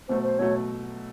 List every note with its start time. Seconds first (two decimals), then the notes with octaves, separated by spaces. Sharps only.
0.08 B2 F#3 A3 C5
0.23 C5
0.39 B2 F#3 A3 C#5